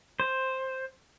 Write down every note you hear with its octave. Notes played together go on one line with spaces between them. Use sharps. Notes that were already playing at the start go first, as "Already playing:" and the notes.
C5